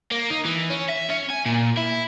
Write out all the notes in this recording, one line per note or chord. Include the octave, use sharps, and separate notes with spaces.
A#3
D#4
E3
C#4
E5
C#4
G#5
A#2
E4